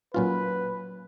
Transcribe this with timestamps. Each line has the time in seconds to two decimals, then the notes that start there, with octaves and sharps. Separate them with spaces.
0.14 A#2 F#3 C#4 F4 B4